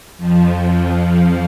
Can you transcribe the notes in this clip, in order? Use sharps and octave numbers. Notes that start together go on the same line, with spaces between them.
F2 F3